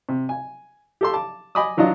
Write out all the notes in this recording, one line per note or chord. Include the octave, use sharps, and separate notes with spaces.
C3
G#5
G4 A4 C6
A5 D6
D#5 G#5 B5 D6 D#6
E3 F#3 D4 F4 D#5